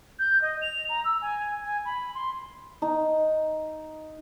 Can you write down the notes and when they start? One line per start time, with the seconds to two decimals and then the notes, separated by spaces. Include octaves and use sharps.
0.19 G6
0.42 D#5
0.62 F7
0.89 A#5
1.05 E6
1.22 G#5
1.64 G#5
1.85 B5
2.15 C6
2.82 D#4